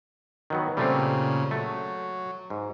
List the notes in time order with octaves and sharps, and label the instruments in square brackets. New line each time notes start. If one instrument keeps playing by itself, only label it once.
[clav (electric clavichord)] D#3 F#3 B3
[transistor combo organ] A#2 C#3 [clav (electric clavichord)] G3 A3 C4
[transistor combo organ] F#3 [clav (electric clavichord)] A3
[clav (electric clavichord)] G#2